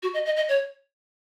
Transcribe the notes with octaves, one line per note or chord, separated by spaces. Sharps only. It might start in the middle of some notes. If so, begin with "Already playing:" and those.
F#4
D#5
D#5
D#5
C#5